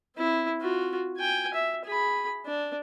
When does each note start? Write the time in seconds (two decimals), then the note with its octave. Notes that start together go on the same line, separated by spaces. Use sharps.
0.16 C4 E4
0.61 F4 F#4
1.17 G5 G#5
1.54 E5
1.85 G#4 B5
2.46 D4